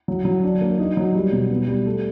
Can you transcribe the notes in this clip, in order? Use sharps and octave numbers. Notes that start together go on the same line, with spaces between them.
F#3
F#3
D4
A#3
D#4
F#3
G3
B2
B3
G3
A3